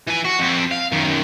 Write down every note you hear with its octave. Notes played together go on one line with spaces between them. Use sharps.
E3 G#5
F#4
F2 C4
F5
F#2 D#3